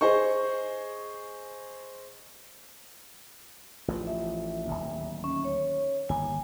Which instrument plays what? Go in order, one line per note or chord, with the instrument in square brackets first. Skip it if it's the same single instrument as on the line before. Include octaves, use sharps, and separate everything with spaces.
[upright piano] G#4 C5 D#5 C#6
[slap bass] A1 A2 F3
[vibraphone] E5
[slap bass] D1 G1 D#2
[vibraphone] C#4
C#5
[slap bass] G1 D#2 [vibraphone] G#5